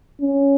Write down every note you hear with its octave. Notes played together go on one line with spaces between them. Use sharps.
C#4